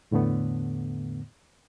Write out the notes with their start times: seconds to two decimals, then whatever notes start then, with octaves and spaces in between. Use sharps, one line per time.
0.11 E2 A2 D3 A3 B3